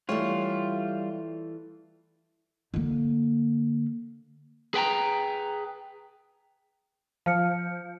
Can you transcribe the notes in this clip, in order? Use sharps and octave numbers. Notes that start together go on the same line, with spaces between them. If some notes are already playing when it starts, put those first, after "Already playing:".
E3 G3 A3 F4 C#5
D3 A#3
G#4 B4 G5 G#5 A#5
F3 F5 F6 C#7